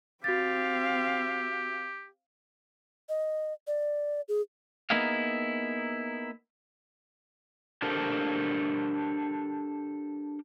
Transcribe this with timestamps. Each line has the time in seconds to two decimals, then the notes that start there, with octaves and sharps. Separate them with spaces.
0.24 C4 F#4 G4 F5 A6
3.09 D#5
3.67 D5
4.29 G#4
4.90 A#3 B3 D#4 E4 G#4 F5
7.82 D4 G4 A4 A#4 C5